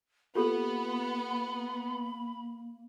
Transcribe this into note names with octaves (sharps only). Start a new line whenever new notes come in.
A#3 B3 F4 G4 A4 B5